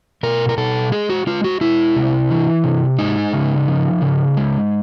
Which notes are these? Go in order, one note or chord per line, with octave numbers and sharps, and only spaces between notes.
B2 A#4
A#4
B2 A4
G#3 G#4
F#4
G#3 F4
F#4
G#3 E4
C3
E3
C3
G#3 D#4
C#3
F3
C#3
G#3